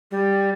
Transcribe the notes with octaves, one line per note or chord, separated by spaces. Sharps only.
G3